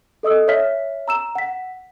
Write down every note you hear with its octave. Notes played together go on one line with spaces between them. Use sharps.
A4 D#5 D#6 E6
C#5 E5 F6 B6
A#5 E6 E7
F#5 B6